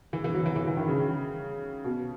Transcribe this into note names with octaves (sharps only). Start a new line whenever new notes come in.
E3
E3
F#3
E3
E3
E3
D#3
C#3
B2